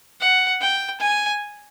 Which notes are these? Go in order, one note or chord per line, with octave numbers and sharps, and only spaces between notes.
F#5
G5
G#5